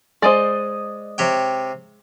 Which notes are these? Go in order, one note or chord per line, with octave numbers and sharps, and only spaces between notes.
G#3 C5 D5 D#5
C3 C#5 G5